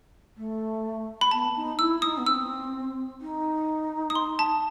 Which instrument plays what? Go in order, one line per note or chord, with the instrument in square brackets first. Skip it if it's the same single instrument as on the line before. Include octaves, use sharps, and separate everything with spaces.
[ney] A3
[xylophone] B5
[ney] B3 [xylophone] A5
[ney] D#4
[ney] E4 [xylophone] E6
[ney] D#4 [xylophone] D#6
[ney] B3
[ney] C4 [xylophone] E6
[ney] D#4
[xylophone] D#6
C6
A5